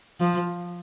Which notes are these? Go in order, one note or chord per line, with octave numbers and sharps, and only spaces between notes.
F3